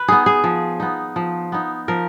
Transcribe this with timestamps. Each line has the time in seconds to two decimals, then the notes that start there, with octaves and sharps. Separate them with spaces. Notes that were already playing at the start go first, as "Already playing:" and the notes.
Already playing: B4
0.08 B3 D#4 G#4
0.26 G#4
0.44 F3
0.80 B3 D#4
1.16 F3
1.52 B3 D#4
1.88 F3 A#4